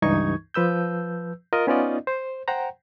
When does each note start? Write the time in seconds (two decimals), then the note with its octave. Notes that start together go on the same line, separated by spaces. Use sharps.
0.02 C#2 G2 E3 D#4 C#6 G#6
0.54 F3 B4 E6 G6
1.53 F4 A#4 D#5
1.67 B3 C#4 D#4 F4 D5 D#5
2.07 C5
2.48 C5 F#5 G5 A#5